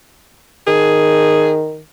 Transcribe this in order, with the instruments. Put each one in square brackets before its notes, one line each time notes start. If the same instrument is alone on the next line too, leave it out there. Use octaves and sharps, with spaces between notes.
[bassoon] D#3 [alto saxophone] G#4